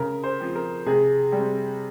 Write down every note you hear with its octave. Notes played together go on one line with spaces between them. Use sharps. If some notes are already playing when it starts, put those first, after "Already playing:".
Already playing: C#3 A#4
C5
F3 C4
A#4
C3 G#4
G3
C4